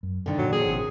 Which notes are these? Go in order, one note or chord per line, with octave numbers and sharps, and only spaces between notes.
F#2
G2 D3 D#3 D4
A#2 E3 F#3
D#2 F3 G#4
G#1 C3